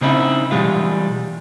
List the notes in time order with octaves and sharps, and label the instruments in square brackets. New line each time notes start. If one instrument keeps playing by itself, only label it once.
[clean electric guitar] C#3 C4 D#4 E4
B2 E3 G3 G#3 F4